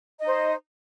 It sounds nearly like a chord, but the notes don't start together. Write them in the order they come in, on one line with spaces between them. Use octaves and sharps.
D#5 D#4 C5